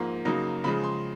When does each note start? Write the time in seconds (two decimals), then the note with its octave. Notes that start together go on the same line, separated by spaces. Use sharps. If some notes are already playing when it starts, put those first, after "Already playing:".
Already playing: G#2 F3 A#3
0.25 F#2 C#3 F#3 A#3 D#4
0.64 C#3 F3 G#3 B5
0.84 C6